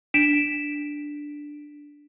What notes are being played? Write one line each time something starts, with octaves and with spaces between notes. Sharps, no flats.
D4 B6 D7 E7